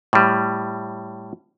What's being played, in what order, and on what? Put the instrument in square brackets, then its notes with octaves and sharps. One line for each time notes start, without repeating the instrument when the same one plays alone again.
[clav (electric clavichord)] A2 G3